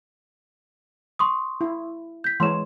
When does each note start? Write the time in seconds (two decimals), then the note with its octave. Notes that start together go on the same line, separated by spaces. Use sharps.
1.19 C6 C#6 D#6
1.61 E4
2.24 G6 B6
2.40 E3 G#3 C#5 C6 E7